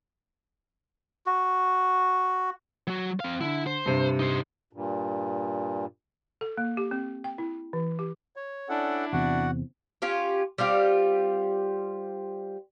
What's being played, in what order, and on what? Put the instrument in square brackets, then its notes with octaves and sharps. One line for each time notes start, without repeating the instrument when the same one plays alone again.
[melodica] F#4
[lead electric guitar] F#3 F#4
C4 F5
[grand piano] D3 [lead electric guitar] E4
[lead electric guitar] C5
[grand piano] G2 C3
[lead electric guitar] D#4 C5
[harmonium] G2 A#2
[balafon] A4
A#3
G4
C4
G5
E4
E3
G4
[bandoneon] C#5
[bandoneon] C#4 A4 F#5 [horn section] D4 E4 D5
[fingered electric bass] E2 C3 [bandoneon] F#4 F#5
[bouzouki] C#4 F4 G4
G3 C4 F4 G4